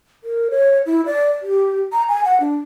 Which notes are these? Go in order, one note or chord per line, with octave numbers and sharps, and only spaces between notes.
A#4
C#5
E4
D5
G4
A#5
G#5
F#5
D4